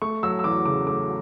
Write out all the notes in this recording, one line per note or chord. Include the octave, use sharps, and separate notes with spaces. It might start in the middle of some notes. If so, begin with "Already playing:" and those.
A3 C#6
F#3 E6
E6
E2 D6
C#3 D6
A3 D6